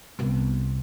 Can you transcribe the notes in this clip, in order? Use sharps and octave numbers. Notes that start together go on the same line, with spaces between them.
C2 B3